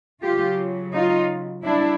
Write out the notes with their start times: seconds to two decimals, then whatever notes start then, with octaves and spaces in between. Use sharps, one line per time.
0.23 C#3 F#3 F4 G4
0.94 D#4 F4
1.65 G3 D4 E4